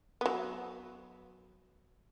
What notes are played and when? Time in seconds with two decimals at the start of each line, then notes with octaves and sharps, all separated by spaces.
0.21 F#3 B3